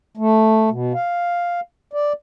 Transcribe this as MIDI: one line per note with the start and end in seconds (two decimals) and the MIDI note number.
0.17 0.70 57
0.70 0.93 47
0.94 1.60 77
1.93 2.13 74